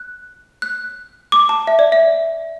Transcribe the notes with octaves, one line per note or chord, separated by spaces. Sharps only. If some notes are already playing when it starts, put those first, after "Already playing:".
Already playing: F#6
F#6
D6
A5
E5
D5
E5